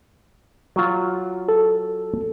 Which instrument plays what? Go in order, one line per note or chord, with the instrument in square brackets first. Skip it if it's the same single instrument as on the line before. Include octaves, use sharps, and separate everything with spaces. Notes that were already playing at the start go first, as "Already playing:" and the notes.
[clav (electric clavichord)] F#3 F4
[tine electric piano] A4